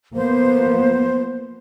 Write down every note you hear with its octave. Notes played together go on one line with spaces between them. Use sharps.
F3 A#3 B3 C5